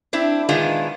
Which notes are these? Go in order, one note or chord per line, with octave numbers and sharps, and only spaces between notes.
C4 D4 E4
A#2 D#3 G#3 B3 D4 F4